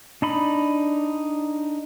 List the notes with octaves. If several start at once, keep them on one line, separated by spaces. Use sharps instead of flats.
D4 D#4 B5